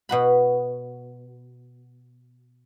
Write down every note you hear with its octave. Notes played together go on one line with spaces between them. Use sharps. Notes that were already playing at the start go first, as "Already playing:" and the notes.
B2 F#4 B5